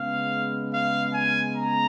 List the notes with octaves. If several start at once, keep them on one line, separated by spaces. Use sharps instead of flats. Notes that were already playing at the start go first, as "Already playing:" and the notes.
Already playing: C#3 G#3 B3 F5
F5
G#5
A#5